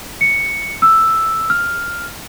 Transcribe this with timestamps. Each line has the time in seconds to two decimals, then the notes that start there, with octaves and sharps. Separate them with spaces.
0.21 C#7
0.82 E6
1.50 F6